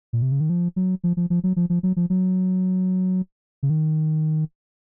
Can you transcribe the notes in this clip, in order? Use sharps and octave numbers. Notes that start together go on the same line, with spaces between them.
A#2
C3
C#3
D#3
F3
F#3
F3
F3
F3
F#3
F3
F3
F#3
F3
F#3
C#3
D#3